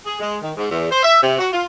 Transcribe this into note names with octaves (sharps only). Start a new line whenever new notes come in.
G#4
G#3
D#3
G#2
E2
C5
E5
C3
F#4
F4